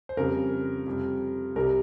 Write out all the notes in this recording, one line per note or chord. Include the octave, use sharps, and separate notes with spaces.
C5
F2 C#3 G3 A#4
F2 C3 G3
C2 C3 G3 A#4